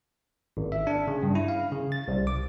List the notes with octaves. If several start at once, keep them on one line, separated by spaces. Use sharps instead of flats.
G#1
E5
D4
C#3
G2
E4
F5
C#3
A6
C2
D6